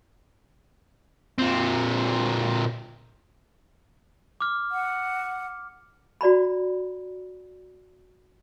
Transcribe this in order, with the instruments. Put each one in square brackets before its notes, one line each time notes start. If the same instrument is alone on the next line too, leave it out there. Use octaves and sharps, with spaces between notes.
[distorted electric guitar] A#2 C4
[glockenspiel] D6 F6
[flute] F#5
[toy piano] F#4 D5 A#5 B5